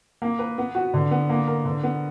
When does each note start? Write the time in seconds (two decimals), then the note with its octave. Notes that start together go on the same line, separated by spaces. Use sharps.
0.22 A#3
0.39 B4
0.58 B3
0.75 F#4
0.94 D3
1.11 B3
1.29 A#3
1.48 A#4
1.65 D3
1.83 B3